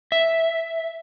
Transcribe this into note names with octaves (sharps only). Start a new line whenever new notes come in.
E5